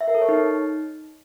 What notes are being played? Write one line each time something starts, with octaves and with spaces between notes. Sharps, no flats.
E5
A#4
A4
C#5
D#4